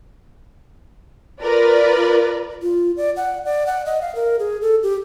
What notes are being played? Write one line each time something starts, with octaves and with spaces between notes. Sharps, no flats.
F4 A#4 B4 D5
F4
D5
F#5
D5
F#5
D#5
F5
A#4
G#4
A4
G4